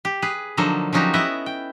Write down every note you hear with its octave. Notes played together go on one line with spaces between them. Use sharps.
G4
G#4 B4
D3 F3 F#3 A#3 D#4 A4
F3 F#3 C#4 D#4 F#4 G4
B3 E4 D#5 E5 F#5
G5